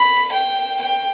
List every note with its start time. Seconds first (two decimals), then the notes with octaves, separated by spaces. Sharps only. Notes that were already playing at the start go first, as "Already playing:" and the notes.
Already playing: B5
0.32 G5
0.81 G5